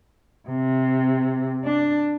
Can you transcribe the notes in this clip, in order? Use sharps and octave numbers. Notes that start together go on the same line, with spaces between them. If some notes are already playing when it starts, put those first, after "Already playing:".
C3
D4